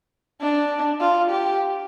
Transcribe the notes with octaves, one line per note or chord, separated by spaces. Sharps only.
D4
F4
G4